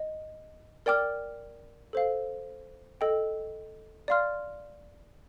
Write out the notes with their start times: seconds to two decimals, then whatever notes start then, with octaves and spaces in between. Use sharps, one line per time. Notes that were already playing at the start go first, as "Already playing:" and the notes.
Already playing: D#5
0.86 A#4 D5 G5 D6 F6
1.93 A4 C5 F5
3.01 A4 D#5 G5
4.08 D5 F5 C6 F6